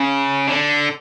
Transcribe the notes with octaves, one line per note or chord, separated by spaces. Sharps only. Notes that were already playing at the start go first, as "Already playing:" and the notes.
Already playing: C#3
D3